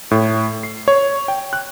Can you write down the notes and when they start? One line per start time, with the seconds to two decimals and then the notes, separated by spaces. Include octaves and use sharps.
0.11 A2
0.63 C7
0.88 C#5
1.28 G5
1.53 F#6